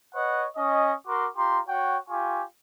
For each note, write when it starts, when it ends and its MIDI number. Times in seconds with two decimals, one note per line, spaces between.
0.15 0.47 71
0.15 0.47 73
0.15 0.47 75
0.15 0.47 78
0.57 0.94 61
0.57 0.94 75
1.08 1.28 66
1.08 1.28 70
1.08 1.28 84
1.08 1.28 86
1.37 1.60 65
1.37 1.60 67
1.37 1.60 82
1.37 1.60 84
1.68 1.98 66
1.68 1.98 73
1.68 1.98 78
1.68 1.98 79
2.09 2.44 65
2.09 2.44 67
2.09 2.44 80
2.09 2.44 85